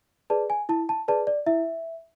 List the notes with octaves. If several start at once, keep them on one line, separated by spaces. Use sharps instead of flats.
G#4 B4 D5 A5
G#5
E4 A5
A5
G#4 B4 D5 A5
D5
E4 E5